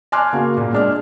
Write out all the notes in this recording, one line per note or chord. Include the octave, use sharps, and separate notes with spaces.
G#5 A5 C6 D6 F6 F#6
C#3 A#3 F#4
A#2
G#3 D4 F6